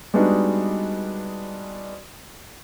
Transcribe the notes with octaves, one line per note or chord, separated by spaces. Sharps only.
G3 G#3 B3 D4 D#4 F#4